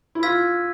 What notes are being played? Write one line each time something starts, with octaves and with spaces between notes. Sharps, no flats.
E4
F4 E6 G#6 B6